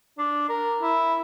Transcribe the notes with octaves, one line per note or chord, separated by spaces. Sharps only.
D4
A#4
E4